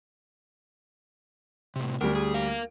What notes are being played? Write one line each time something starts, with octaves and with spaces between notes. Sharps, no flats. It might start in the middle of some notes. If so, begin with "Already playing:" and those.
A2 C3
D2 G3 A#4
G#4
A#4 F5